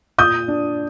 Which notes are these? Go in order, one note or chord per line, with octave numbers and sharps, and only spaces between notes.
A#2 D#6 G6
D4